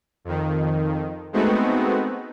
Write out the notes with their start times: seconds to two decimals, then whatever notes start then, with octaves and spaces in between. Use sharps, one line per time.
0.25 F2 D#3
1.33 G#3 A3 B3 C4 D#4 F#4